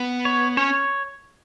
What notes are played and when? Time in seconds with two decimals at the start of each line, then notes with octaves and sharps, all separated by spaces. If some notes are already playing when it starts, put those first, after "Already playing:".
Already playing: B3
0.25 C#5
0.57 C#4 C#5